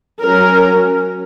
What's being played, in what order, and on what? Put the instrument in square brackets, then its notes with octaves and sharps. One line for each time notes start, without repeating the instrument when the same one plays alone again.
[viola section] F#3 C#4 A#4